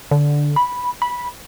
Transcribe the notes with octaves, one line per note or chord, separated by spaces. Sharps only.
D3
B5
B5